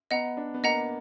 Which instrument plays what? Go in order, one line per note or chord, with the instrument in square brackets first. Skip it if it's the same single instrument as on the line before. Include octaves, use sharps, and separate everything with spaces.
[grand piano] B3 [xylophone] D#5 F#5 A#5
[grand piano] D4
B3
[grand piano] A#3 [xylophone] D#5 F#5 A#5